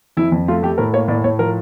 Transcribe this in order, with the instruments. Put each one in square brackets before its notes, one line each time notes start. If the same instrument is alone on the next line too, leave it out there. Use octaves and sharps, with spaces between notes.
[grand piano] F2 E4
F2
A3 F4
A3 G4
A2 A#4
A#3 C#5
A2 D5
A2 C#5
F3 A#4